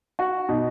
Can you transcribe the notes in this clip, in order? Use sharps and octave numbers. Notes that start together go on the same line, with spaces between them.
F#4
B2 D#4